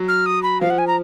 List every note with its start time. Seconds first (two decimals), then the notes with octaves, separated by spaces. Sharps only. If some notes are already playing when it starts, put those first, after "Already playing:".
Already playing: F#3
0.08 F6
0.26 D#6
0.43 B5
0.61 F3 F5
0.70 F#5
0.78 G#5
0.87 A#5